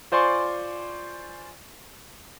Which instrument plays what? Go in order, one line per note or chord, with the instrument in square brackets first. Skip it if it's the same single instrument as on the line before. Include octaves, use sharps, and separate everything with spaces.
[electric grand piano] F4 C5 D5 G#5 C6 C#6